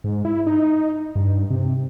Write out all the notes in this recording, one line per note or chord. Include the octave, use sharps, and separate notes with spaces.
G#2
E4
D#4
G2
C3